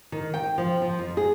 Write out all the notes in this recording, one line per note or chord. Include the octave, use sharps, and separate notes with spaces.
D#3
G5
F3
F3
F2
G#4